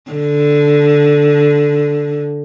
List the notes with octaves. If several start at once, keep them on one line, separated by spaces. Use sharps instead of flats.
D3